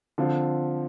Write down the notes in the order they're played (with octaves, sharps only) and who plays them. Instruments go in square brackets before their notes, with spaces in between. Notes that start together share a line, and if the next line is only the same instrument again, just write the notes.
[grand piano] D3 F3 C4 F4